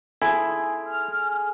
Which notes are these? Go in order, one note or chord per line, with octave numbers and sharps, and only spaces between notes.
E4 G#4 A4 C6 G#6
F6